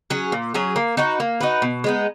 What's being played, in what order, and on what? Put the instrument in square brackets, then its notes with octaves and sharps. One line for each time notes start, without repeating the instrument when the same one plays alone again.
[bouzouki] F#3 C#4 G#4
A#2
F#3 C#4 G#4
A#3
D#4 F#4 B4
A#3
D#4 F#4 B4
B2
G#3 B3 D#4